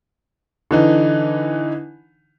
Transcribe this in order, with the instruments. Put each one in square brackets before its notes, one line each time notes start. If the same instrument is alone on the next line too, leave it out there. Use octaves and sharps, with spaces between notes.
[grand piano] D3 E3 D#4